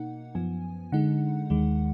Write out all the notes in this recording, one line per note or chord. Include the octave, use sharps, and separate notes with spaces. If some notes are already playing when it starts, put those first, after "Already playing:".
Already playing: B2 A#3 D#4 F#5
F#2 F3 B3 G#5
D3 G#3 D#4 F#5
D#2 D#3 G#3